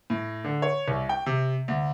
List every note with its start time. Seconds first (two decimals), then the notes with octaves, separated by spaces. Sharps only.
0.10 A2
0.44 D3
0.62 C#5
0.88 C2
1.09 G5
1.26 C3
1.68 D2